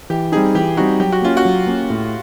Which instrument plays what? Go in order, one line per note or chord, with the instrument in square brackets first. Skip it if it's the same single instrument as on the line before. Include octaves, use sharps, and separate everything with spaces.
[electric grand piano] E3 [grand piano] G4
[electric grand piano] G3 C4 D#4 [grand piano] G#4
[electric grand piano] E3 [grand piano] G4
[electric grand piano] G3 C4 D#4 [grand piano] F#4
[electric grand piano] F#3 [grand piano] G4
[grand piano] F#4
[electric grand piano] A#3 C#4 [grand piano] F4
[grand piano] F#4
[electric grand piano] F#3
A#3 C#4
A2